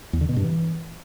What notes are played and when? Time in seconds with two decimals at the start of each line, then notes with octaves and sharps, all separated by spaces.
0.13 E2
0.21 D3
0.29 B2
0.36 G2
0.44 E3